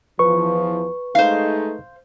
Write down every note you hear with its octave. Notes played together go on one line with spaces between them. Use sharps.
E2 E3 F3 B4 C#6
G#3 A3 D#4 C5 F5